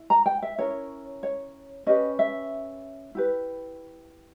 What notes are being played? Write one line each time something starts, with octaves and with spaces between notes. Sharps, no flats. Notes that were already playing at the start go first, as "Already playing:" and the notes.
Already playing: E4
A#5
G5
E5
C#4 E4 A#4 C#5
C#5
C#4 G4 B4 D#5
E5
E4 G4 B4